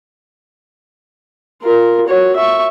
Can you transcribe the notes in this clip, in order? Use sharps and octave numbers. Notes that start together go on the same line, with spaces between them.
F4 A#4
F#4 C#5
E5 C#6